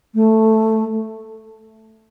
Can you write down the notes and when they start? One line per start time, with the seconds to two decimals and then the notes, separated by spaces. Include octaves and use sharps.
0.15 A3